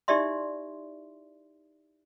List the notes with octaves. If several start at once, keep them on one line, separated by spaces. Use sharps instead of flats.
D#4 E4 G4 D5 E5 C6